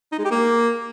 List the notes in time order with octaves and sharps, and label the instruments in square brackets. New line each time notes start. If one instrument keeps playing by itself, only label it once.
[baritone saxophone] D#4
G#3
G4
A#3